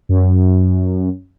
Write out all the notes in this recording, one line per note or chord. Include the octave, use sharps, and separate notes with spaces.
F#2